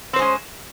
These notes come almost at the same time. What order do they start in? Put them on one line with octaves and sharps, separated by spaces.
C4 C5 G#3 C#4